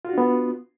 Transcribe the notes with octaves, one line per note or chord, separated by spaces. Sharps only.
B3 D4 F4 F#4